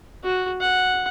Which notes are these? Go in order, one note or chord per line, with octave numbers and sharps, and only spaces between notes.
F#4
F#5